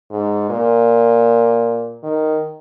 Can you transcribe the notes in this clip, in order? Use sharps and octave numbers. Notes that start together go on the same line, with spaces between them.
G#2
A#2
D#3